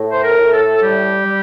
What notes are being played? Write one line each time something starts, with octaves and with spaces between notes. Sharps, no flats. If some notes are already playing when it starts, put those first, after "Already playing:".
Already playing: A2
C5
A#4
A2
A4
G3 G4
G3